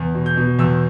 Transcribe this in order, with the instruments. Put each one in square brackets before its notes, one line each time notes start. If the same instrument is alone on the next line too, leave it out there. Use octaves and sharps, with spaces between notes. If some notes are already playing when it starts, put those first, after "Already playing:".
Already playing: [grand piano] E2
B2
G6
B2
E2 E6